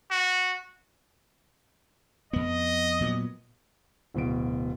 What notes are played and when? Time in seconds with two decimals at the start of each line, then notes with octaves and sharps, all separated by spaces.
0.11 F#4
2.33 F2 B3 D#5
3.01 A#2 F#3 B3
4.14 D1 B2 D7